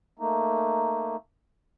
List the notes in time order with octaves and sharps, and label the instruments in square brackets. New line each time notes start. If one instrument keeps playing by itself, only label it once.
[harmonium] A3 A#3 D#4